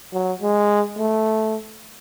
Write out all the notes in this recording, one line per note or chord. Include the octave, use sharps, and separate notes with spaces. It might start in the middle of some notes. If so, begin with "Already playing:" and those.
F#3
G#3
A3